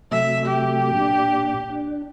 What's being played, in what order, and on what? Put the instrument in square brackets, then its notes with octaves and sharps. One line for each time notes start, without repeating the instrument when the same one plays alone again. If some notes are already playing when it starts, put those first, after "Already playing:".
[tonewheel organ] C3 F#3 A3 [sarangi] E5
[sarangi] G4
[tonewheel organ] A#2 D4
D4